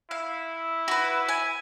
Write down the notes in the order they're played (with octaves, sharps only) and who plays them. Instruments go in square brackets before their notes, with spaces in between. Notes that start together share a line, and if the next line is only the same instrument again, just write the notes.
[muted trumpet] E4 [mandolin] F5
[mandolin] F#4 B4
G#5